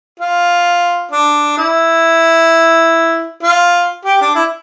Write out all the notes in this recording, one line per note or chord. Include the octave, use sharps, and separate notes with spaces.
F4
D4
E4
F4
G4
D4
E4